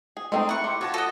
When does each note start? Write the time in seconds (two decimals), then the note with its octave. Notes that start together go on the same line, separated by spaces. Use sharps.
0.17 G#4
0.32 G#3 A3 C4 D#4
0.49 E4 F#5 C#6
0.64 G4 C6
0.81 F4 F#4 C#5 A5
0.94 A4 D#5 F#5 A5 A#6